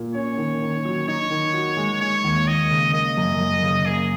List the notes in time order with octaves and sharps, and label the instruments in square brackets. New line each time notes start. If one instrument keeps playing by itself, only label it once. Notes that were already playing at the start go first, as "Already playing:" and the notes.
Already playing: [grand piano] A#2
[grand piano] C#4 [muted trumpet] C#5
[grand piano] D#3
D#3
F#3
[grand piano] D#4 [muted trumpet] C#5
[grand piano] D#3
F#4
G#3
[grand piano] G#3 [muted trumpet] C#5
[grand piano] D#2
[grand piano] D#2 [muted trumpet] D#5
[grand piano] C#3
[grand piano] A#3 [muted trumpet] D#5
[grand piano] F#2
F#2
C#3
[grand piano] A#3 [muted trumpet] G#4